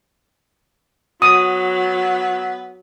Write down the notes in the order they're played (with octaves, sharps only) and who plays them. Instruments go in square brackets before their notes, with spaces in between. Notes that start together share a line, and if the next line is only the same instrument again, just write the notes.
[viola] F#3 [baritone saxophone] B3 [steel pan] D#6